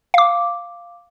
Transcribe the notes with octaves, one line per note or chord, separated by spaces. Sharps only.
F5 D6